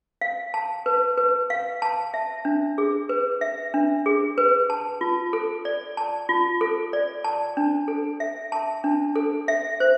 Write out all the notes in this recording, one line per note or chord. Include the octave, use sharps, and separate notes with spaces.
F5
A5
B4
B4
F5
A5
E5
D4
G#4
B4
E5
D4
G#4
B4
A5
F4
A4
D5
A5
F4
A4
D5
A5
D4
A4
E5
A5
D4
A4
E5
C5